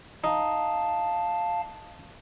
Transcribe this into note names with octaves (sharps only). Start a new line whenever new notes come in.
D#4 F5 A5